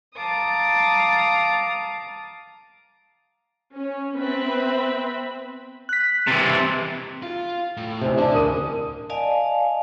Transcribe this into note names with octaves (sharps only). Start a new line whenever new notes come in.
F5 A5 A#5 D6 D#6
C#4
B3 C4 B4 E5 B5
F#6 B6
C3 E3 A6
F4
A2
A1 C3 C5
D3 D4
D1 A#4 D#6 D#7
D5 D#5 F5 G#5 A5